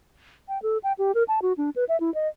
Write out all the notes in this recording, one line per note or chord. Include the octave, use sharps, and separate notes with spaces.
G5
A4
G5
G4
A#4
A5
F#4
D4
B4
E5
E4
D#5